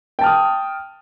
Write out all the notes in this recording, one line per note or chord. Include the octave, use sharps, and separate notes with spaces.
G5 A5 D#6 F6